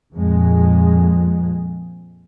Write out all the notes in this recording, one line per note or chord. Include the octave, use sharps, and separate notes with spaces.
F2 A#2 G#3